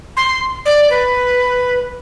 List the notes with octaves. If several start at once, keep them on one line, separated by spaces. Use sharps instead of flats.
C6
D5
B4